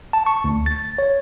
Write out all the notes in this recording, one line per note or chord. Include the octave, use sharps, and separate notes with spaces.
A5
C#6
D2
A6
C#5